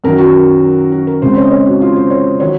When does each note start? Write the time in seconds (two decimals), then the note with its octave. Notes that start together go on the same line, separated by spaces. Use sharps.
0.04 F#2 D#3 F#3 A#4
0.18 F#4
0.92 F#4
1.07 A#4
1.22 F2 C#3 G#3 C5
1.37 C#5
1.44 D#5
1.51 C#5
1.66 F#4
1.81 F4
1.96 C5
2.10 C#5
2.40 D#3 F#3 C#5